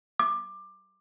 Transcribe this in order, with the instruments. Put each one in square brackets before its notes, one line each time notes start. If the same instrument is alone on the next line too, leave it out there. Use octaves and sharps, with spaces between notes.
[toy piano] D6